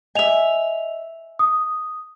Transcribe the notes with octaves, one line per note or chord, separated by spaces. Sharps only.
D#5 E5 G#5 F7
D#6